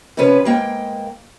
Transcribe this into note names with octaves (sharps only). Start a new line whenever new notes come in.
C3 F3 C#4 B4
G#2 A#3 G5